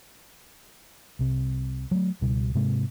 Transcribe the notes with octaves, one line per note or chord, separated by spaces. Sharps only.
C2 C3
F#3 A3
C#2 B2 G3
G#2 C3 G#3